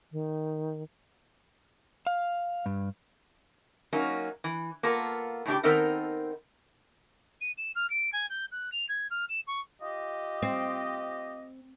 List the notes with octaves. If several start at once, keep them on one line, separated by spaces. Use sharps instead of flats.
D#3
F5
G2
F#3 A#3 C#4 D#4
E3
A#3 B3 F4 A4
A2 C#3 D4 G4
D#3 B3 C4 D#4 A4 A#4
D#7
E7
F6
D7
G#5
G6
F#6
F7
G#6
F6
E7
C#6
F4 G4 D#5
C4